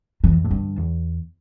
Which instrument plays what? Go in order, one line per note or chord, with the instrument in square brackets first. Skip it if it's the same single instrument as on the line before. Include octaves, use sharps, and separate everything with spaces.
[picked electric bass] F2 [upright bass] E3
[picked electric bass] A2
[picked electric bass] G2 [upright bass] D3
[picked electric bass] E2